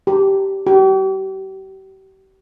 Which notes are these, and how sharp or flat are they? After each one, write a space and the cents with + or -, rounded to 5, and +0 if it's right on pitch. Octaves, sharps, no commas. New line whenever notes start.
G4 -10
G4 -40